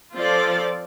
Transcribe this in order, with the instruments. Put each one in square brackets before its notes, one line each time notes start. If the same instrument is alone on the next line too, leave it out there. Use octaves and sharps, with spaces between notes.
[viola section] F3 C4 F4 A4 D5